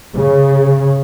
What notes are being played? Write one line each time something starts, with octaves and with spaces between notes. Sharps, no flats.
C#3